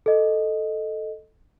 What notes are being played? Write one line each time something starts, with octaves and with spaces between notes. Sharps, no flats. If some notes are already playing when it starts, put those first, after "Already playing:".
A4 D#5